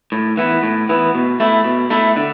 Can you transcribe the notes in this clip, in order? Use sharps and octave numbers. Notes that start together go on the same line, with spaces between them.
A2
E3 B3
A2
E3 B3
B2
A3 E4
B2
A3 E4
D3